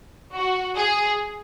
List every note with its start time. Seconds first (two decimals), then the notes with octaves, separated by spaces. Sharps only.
0.34 F#4
0.76 G#4